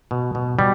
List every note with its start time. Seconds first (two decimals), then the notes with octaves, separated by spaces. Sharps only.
0.11 B2
0.35 B2
0.59 B2 G3